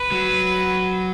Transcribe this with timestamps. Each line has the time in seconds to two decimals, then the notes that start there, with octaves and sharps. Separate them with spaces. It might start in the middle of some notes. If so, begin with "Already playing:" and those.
Already playing: B4
0.12 F#3